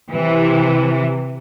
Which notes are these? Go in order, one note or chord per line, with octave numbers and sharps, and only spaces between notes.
C3 E3